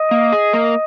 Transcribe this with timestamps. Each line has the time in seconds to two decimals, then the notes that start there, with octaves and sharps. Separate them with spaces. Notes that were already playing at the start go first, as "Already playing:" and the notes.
Already playing: D#5
0.11 A#3
0.32 G#4
0.53 A#3